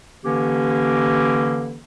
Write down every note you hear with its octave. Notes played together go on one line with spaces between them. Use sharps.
D3 E3 A#3 C#4 G4